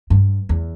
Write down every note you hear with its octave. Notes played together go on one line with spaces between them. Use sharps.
G2
E2